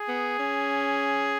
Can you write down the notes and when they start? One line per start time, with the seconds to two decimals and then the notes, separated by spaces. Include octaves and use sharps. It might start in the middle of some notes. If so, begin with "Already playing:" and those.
Already playing: G#4
0.08 B3
0.39 C#4